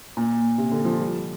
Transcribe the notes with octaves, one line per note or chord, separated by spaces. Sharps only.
A#2
C3
D3
F3
G3